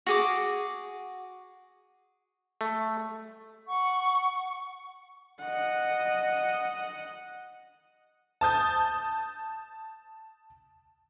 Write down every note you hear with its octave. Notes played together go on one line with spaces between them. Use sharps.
F#4 G#4 D6
A3
F#5 C#6
D#5 F#5
A5 D#6 G6